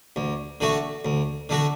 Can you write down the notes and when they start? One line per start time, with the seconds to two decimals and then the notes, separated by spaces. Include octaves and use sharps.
0.16 D2
0.61 D3 A3 F#4
1.05 D2
1.49 D3 A3 F#4